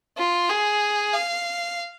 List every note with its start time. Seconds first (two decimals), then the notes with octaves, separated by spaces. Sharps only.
0.17 F4
0.50 G#4
1.13 F5